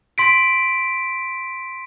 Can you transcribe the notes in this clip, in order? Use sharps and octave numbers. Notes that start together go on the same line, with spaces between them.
C6 B6 D7